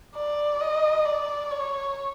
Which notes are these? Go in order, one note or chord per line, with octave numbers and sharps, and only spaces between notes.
D5
D#5
D5
C#5